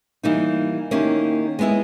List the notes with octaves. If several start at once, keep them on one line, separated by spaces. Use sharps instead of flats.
E3 G3 A#3 D#4
D#3 A#3 C#4 E4 G4
G#3 B3 E4 G#4